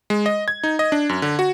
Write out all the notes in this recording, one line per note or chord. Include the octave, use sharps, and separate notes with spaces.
G#3
D#5
G#6
D#4
D#5
D4
F#2
D3
F#4